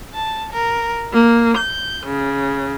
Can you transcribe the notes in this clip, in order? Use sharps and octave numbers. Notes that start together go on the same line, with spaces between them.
A5
A#4
A#3
G6
C#3